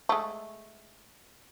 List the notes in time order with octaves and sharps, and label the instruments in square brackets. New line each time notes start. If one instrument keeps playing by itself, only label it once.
[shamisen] G#3 A3